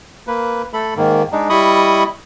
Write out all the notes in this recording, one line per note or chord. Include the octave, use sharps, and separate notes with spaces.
A#3 B4
A3 A4 B5
G#2 D#3 A#3
G#3 D4 D#4
G3 E4 D#5 B5 C#6 D#6